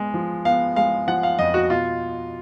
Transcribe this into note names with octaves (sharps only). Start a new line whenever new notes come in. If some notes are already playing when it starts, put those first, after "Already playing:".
Already playing: G#3 B3
F3
B3 F5
G#3 F5
F3 F#5
F5
F2 D#5
F#4
B2 F4